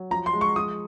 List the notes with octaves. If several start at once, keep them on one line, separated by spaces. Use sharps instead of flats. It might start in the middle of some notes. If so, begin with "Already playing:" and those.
Already playing: F#3
F3 A#5
C6
G#3
C#6
F3 D#6